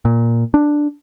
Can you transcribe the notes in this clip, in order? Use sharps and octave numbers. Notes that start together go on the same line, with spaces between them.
A#2
D4